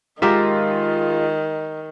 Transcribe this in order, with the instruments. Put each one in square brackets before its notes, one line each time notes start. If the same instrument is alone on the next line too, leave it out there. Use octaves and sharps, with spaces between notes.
[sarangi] D#3 [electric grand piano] G#3 F4 [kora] G4 A#4 E5